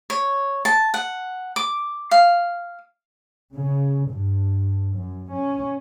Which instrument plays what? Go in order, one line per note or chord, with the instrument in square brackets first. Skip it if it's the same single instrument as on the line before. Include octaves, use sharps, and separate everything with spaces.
[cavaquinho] C#5
A5
F#5
D6
F5
[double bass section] C#3
G2
F#2
C#4